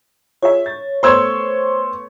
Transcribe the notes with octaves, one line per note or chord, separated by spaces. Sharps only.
F4 G#4 C#5 E5
A6
A3 B3 C5 C#5 C6 E6 G#6